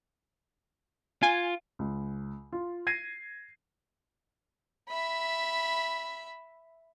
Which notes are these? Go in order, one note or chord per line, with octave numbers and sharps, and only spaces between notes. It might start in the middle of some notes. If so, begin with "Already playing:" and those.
F4 G#5
C#2
F4
G#6 A#6 C7 D#7
E5 B5